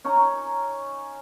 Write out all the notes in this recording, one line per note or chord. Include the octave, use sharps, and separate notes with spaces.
C#4 D#4 A#5